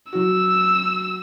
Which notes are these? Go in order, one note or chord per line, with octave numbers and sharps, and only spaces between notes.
F#3 F#4 E6